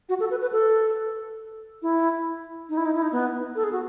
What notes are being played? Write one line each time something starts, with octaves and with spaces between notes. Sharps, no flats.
F#4
A4
B4
B4
A4
E4
D#4
E4
D#4
E4
D#4
B3
A4
G#4
F#4